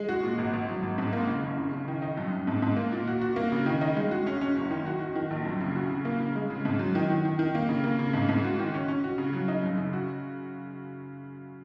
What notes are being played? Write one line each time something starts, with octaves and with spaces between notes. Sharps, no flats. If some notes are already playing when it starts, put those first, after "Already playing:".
Already playing: G#3
F#4
A#2
G#1
G#1
F#3
G#1
G#2
A#3
C#3
F#1
C#3
C#3
D#3
D#4
F#2
F#2
G#2
G#2
A#3
A#2
F#4
F#4
A#3
C#3
D#3
D#4
G#3
F#4
C#4
C#4
F#1
D#3
F#4
F#4
D#3
A#1
F#2
C#3
F#4
C#3
A#3
C#3
G#3
C#3
G#2
F#3
D#3
D#3
D#3
D#3
A#3
C#3
A#3
C#3
G#2
G#2
F#4
D#3
C#4
C#4
F#4
C#3
F#3
D#4
F#2
C#3
F#4